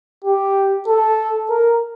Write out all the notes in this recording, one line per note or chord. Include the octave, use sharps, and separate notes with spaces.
G4
A4
A#4